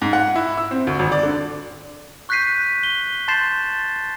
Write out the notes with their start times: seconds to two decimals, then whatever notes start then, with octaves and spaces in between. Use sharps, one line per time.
0.02 G#2
0.13 F#5
0.36 E4
0.57 E6
0.71 C4
0.87 D2
0.99 G#1
1.12 D5
1.23 D3
2.29 C#6 F#6 G6 B6 C7 D#7
2.83 G7
3.28 A5 C6 G6 A6 C7 E7